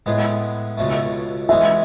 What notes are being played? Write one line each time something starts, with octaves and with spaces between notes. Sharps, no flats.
A2 G#3 B3
C#2 B2 A3
E3 G#3 C#4 E5